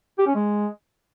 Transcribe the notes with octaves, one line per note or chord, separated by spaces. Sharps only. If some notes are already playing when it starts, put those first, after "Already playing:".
G4
C#4
G#3